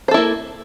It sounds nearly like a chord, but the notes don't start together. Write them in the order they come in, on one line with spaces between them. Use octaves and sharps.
C5 A4 E4 A#3